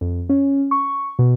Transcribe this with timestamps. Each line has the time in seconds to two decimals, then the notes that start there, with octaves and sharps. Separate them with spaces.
0.01 F2
0.29 C#4
0.71 C#6
1.19 B2